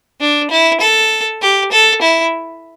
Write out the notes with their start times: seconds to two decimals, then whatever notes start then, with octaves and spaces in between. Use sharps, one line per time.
0.21 D4
0.51 E4
0.81 A4
1.42 G4
1.72 A4
2.02 E4